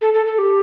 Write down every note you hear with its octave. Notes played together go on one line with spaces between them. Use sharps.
A4
A4
A4
G4